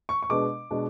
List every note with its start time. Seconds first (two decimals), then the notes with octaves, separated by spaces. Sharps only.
0.09 C#6
0.22 C#6
0.30 B2 G#3 B3 D4 D6
0.71 B2 G#3 B3 D4